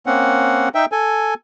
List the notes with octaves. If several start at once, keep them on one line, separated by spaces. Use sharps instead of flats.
A#3 C4 C#4 F#5
D#4 E5 G5
A4 G#5